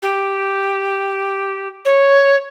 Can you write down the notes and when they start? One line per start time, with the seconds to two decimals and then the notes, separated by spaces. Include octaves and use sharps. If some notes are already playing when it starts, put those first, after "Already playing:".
0.02 G4
1.85 C#5